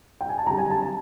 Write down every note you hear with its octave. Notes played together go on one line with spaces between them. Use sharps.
G5
G#5
A5
F#2 D3 G3 A#5
G#5
A5
A5